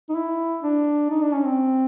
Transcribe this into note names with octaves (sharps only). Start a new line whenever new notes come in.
D#4
E4
D4
D#4
D4
C#4
C4